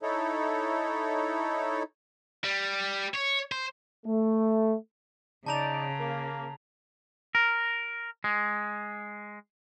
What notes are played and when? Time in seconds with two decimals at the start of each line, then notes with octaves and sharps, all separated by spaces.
0.02 D#4 E4 A4 C#5
2.44 G3
3.14 C#5
3.52 C5
4.06 A3
5.46 C#3 D#4 D5 A5 A#5 F7
5.98 A#3
7.35 A#4
8.24 G#3